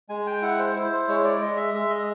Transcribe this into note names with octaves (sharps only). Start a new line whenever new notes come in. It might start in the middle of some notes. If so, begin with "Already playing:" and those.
G#3 G#5
G5
E4 F#5
C5
E4 C5
C5
G#3 C#5
D5
G#3 D#5
E5
G#3 E5
D#5